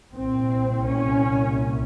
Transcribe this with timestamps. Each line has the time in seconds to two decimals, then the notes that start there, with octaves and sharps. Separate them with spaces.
0.15 C2 A#2 C4
0.86 C#4